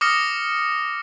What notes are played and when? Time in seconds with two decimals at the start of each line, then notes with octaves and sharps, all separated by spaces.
0.01 D6 D#6 F6 A#6 C#7